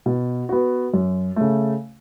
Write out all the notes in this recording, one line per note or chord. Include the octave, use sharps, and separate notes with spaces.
B2
B3 F#4
F#2
C#3 A3